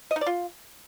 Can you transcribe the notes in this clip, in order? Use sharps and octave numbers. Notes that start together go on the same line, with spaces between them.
D#5
D#4
D5
F4